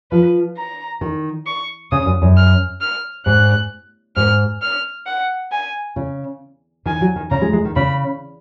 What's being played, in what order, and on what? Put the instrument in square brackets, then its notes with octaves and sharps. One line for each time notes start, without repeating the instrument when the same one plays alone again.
[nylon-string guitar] F3 [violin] B4
[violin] A#5
[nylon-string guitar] D#3
[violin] C#6
[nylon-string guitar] C#3 [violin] D#6
[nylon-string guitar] F#2
F#2
[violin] F6
F6
[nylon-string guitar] G#2 [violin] F#6
[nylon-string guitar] G#2 [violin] F6
[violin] F6
F#5
G#5
[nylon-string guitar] C#3
[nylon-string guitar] D#3 [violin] G#5
[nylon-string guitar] F#3
D#3
[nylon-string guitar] C#3 [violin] A#5
[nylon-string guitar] G#3
G#3
D#3
[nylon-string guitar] C#3 [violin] B5